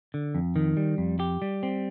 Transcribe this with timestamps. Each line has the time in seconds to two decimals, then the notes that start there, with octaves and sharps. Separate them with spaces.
0.14 D3
0.35 F2
0.56 D#3
0.77 G3
0.98 F2
1.20 G4
1.42 G3
1.63 C4